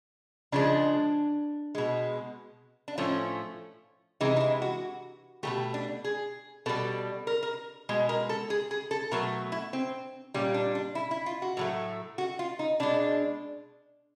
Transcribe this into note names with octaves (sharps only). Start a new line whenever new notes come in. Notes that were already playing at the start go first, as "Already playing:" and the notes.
C#3 F3 G#3 D4
B2 G#3
D4
A2 F3 A3 C#4
C3 E3 G#3 D#4
D#4
E4
F#4
B2 F#3 A3 G4
D4
G#4
B2 G3 A4
A#4
A#4
B2 G#3
A#4
A4
G#4
G#4
A4
B2 F#3 A3 A#4
E4
C4
A#2 G3 C#4
D4
D4
E4
E4
F4
F#4
A2 F#3 A3
F#4
F4
D#4
B2 G#3 D4